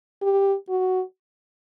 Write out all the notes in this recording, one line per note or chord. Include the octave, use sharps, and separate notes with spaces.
G4
F#4